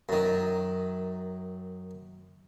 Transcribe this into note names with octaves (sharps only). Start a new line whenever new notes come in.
F#2 D#3